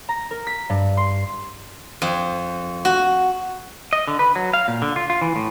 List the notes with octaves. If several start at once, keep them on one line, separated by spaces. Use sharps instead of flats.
A#5
A#4
B6
G2
C6
F2
F#4
D#5
D3
B4
F#3
F5
A#2
D3
F4
F4
E3
A2